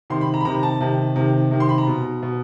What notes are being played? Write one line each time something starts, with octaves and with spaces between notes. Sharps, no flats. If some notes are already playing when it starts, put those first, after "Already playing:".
C3 D#3 C6
B5
A#5
B5
C3 D#3 A#5
A5
C3 D#3
C3 D#3
C3 D#3
C6
B5
A#5
B2
B2